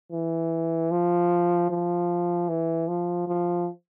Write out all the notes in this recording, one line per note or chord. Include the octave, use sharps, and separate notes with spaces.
E3
F3
F3
E3
F3
F3